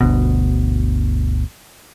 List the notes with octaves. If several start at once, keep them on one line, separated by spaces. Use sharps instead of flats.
G1 D2 B2